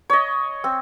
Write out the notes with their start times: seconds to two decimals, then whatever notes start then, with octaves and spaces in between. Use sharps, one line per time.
0.10 C#5 D#5
0.64 C4